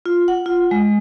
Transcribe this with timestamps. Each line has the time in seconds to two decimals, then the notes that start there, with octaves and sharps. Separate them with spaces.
0.06 F4
0.28 F#5
0.46 F4
0.71 G#3